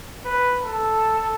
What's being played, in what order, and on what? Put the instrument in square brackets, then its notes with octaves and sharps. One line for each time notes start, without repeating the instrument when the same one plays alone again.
[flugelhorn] B4
A4